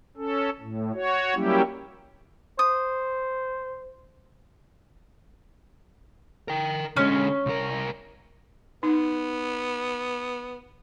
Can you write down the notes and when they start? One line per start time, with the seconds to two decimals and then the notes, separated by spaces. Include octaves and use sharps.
0.17 C#4 A4
0.60 A2
0.94 F#4 C#5
1.35 F#3 G3 A#3 C#4 E4 G4
2.59 C5 D#6
6.48 A#4 G5
6.97 D3 G#3 C#4
7.46 C2 A#4
8.83 B3 D#4